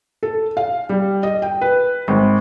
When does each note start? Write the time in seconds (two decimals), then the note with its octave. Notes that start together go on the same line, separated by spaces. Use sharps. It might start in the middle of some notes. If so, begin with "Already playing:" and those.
0.23 A4
0.57 F5
0.89 G3
1.23 D#5
1.42 G5
1.61 B4
2.08 G#1